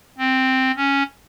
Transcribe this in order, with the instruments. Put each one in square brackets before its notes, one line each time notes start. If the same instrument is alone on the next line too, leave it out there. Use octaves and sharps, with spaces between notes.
[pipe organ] C4
C#4